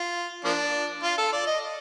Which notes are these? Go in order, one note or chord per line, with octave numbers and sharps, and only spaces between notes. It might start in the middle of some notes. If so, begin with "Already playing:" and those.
Already playing: F4
F3 A#3 D4
F4
A4
D5
D#5